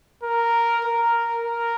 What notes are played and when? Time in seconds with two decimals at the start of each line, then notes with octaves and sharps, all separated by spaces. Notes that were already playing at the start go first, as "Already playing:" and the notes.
0.23 A#4
0.85 A#4
1.46 A#4